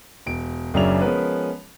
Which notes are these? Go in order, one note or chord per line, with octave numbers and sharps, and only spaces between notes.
E1 D7
F#1 F#2 C#3 D4 E5 F7
F3 G#3 B3 C#4 A#4 B4